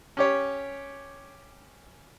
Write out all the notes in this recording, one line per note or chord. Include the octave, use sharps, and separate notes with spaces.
C#4 G4 C#5